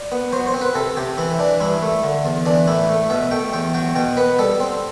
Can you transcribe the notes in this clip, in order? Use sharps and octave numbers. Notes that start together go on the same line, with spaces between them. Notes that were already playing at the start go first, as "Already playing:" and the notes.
Already playing: D5
B3
F#3 C5
C5
C4
B4
C3 A4
C3 G4
E3 E4
E3 D4
G2 E4
A3
D3
E2
E3 D4
A2 E4
A3
B2 E5
A3 G5
E2 G5
F#3 G5
B2 G5
B3 B4
G3 A4
C4